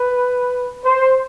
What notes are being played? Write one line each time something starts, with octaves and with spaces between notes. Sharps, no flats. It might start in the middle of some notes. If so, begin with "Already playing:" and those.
Already playing: B4
C5